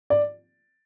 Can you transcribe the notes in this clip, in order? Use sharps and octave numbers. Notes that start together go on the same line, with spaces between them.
D5